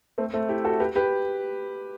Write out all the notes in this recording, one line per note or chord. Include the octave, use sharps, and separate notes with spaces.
A3 C4
A3 C4
E4 G4
F#4 A4
G4 B4
G4 B4